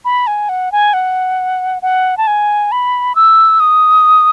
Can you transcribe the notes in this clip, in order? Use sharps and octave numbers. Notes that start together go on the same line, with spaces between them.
B5
G#5
F#5
G#5
F#5
F#5
A5
G#5
B5
E6
D#6